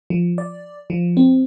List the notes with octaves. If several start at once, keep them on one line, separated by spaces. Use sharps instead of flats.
F3
D5
F3
C4